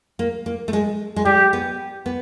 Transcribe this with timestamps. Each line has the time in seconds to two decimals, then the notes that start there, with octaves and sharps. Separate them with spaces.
0.19 A#3
0.46 A#3
0.68 A3
0.73 G#3
1.16 G#3
1.25 G3 G4
1.53 B3
2.06 B3